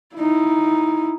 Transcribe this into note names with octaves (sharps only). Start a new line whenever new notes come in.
D#4 E4